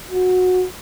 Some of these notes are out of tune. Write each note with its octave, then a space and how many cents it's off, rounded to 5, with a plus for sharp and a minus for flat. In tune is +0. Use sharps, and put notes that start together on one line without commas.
F#4 -15